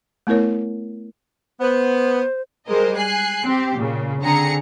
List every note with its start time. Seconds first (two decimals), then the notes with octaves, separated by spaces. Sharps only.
0.27 A3 B3 E4 A#4 C#5
1.60 B3 C5
2.68 G3 G#3 A#4 C5 D#5
2.97 G#5 F#6 C7
3.44 C4 G4
3.77 A#2 C#3
4.22 D3 C4 G#4 A#5 C#7